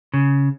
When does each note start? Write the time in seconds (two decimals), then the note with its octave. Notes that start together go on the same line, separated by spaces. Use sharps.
0.14 C#3